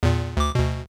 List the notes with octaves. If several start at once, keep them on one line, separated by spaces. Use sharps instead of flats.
E2 A#2
D2 D6
D2 B2